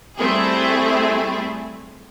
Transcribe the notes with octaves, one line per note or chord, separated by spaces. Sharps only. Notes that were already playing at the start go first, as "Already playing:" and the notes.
G3 A3 C4 E4 G#4